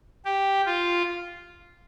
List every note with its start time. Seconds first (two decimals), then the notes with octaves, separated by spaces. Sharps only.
0.25 G4
0.66 F4